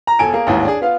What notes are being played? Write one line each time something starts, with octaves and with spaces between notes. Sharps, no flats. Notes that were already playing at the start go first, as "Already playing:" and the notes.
A#5
E1 A4 G#5 D7
A#3 G#4
A1 D#2 G#2 E3
D4 G#4
B3 F4 F5